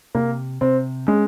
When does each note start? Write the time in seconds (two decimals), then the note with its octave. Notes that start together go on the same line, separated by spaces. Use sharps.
0.15 C3 A#3
0.61 C3 C4
1.08 G#3 C#4